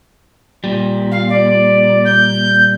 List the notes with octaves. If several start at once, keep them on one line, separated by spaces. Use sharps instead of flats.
A#2 G3
F5
D5
G6